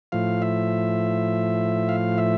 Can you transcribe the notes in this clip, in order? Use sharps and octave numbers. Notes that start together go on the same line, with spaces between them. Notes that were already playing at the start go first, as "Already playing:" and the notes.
A2 F3 F5
E5
F5
E5